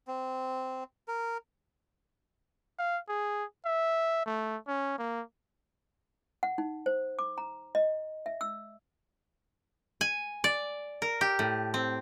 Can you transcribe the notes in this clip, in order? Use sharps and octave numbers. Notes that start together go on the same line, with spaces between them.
C4
A#4
F5
G#4
E5
A3
C#4
A#3
F#5
D#4
C5
D6
A#5
D#5
E5
E6
G#5
D5
A#4
G4
A2
C4